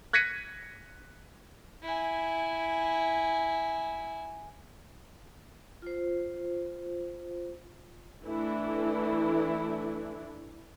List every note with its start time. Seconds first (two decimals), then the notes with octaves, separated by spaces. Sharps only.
0.13 F#6 G#6 A#6 B6 C#7 D#7
1.82 E4 G#5
5.82 F4 C5
8.24 E3 A3 D4 E4